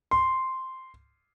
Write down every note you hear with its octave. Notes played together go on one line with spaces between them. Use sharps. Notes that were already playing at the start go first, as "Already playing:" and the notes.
C6